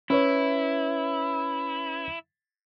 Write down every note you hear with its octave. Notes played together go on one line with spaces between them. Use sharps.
C#4 E4 B4 C#5